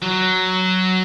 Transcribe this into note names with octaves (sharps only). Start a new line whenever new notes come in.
F#3